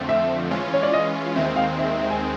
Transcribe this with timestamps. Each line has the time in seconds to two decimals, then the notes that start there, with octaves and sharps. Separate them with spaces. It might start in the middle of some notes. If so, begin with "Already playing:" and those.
Already playing: F2 D3 F3 A3 C4
0.09 E5
0.51 E3 G#3 C#4 F4
0.74 C#5
0.83 D5
0.93 D#5
1.36 D#2 D#3 G#3 C4 E5
1.56 F5
1.79 E5
1.89 E5
1.99 E5
2.10 G#5